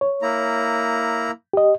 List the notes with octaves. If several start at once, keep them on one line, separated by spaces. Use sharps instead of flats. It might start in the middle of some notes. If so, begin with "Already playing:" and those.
C#5
A#3 E4 A#5
G4 D#5